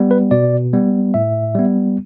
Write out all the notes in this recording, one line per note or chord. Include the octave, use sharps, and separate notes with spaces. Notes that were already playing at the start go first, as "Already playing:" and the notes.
Already playing: G3 B3
B4
B2 D5
G3 B3
A2 E5
G3 B3